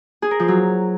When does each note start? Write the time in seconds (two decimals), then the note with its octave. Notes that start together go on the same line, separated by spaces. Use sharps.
0.22 G#4
0.31 A#4
0.40 F3
0.48 F#3